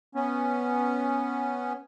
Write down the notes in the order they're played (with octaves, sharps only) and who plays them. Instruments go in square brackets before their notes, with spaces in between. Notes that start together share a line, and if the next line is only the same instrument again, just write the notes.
[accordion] B3 C#4